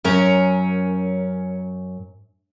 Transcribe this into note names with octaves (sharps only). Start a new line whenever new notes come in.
F#2 C#4 A#4